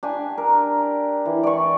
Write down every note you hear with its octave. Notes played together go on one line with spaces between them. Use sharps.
D4 G4 G#5
A#4
E3
D5 C#6